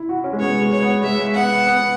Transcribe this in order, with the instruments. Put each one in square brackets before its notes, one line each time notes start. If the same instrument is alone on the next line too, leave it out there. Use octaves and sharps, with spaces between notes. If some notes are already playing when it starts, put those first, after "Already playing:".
Already playing: [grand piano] E4
F#4
C#4
G#3
[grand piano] B3 [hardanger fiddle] C#5
[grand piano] G#3
[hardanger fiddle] C#5
[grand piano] B3
[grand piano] G#3 [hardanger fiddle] E5
[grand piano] B3 [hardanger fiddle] F#5
[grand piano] B3